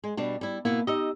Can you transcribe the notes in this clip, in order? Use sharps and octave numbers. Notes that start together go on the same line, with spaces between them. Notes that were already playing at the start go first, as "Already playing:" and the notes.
G#3
B2 G3 D4
G3 E4
B2 A#3 B3 E4
D#4 G4 D#5 E6